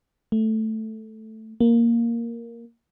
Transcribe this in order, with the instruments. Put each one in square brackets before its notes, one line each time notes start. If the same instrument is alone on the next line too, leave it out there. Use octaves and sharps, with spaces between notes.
[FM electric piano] A3
A#3